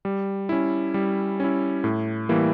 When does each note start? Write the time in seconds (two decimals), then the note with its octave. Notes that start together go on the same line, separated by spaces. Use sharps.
0.05 G3
0.49 C#4 E4
0.94 G3
1.40 C#4 E4
1.84 A2
2.29 E3 G3 A#3 E4